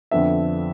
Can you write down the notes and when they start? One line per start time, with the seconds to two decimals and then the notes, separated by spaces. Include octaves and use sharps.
0.11 F2 D3 F3 B3 D4 E5